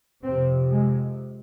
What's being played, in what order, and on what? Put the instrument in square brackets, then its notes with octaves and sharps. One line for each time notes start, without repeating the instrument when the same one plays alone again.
[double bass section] F2 C3 C4
G#3